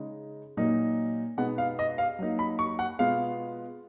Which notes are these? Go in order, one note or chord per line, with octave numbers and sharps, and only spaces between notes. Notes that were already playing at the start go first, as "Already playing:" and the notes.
Already playing: C#3 G#3 D#4
A#2 F#3 A#3 D#4
B2 G#3 B3 D#4 F#5
F5
D#5
F5
F#3 A#3 D#4
B5
C#6
F#5
B2 G#3 B3 F4 F5